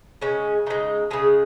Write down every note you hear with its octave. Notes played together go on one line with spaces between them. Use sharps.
C#3 G#3 C#4
C#3 G#3 D#4
C#3 G#3 G#4